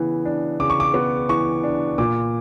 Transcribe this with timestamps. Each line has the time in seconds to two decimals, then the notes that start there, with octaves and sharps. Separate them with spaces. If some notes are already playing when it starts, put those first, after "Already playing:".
Already playing: C#3 E3 B3
0.25 D4
0.60 C#3 D6
0.70 C#6
0.80 D6
0.94 B3
1.29 E3 C#6
1.64 D4
1.98 A#2 D6